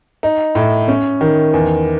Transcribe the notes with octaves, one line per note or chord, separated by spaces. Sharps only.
D#4
A2
C#4
D#3
E2